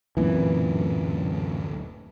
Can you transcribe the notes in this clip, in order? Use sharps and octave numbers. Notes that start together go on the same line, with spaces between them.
D1 F#2 A#2 E3 A3 C4